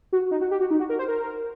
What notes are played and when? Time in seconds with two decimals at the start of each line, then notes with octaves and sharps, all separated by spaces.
0.13 F#4
0.31 D#4
0.41 F#4
0.51 G4
0.61 F#4
0.71 D#4
0.80 F#4
0.90 A#4
0.99 C5
1.08 A#4